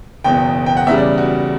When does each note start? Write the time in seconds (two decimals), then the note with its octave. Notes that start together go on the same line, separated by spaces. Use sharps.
0.24 F#1 E2 B2 G5
0.66 G5
0.77 F#5
0.87 E2 C#3 G3 E5
0.98 D5
1.18 F#4